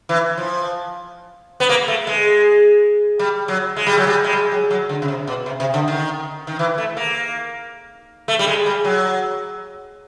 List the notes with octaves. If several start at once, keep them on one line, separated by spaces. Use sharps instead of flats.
E3
F3
B3
A#3
A3
G#3
G3
F#3
G#3
G3
F#3
G3
G#3
G3
F#3
F#3
D3
C#3
C3
B2
C3
C3
D3
D#3
D#3
E3
A3
A#3
A3
G3
G#3
G3
F#3